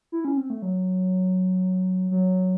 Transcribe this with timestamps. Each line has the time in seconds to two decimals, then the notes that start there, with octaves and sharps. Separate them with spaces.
0.12 E4
0.25 C#4
0.37 C4
0.50 A3
0.62 F#3
2.11 F#3